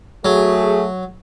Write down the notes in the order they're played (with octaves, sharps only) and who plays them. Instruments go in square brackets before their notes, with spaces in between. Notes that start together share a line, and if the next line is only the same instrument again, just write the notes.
[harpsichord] F#3 [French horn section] A3 F#4 G#4